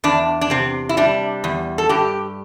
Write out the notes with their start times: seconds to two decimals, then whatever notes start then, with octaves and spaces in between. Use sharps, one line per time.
0.04 E2 D4
0.41 D4
0.50 C3 C4
0.89 E4
0.97 G3 D4
1.44 E2
1.78 A4
1.89 G2 G4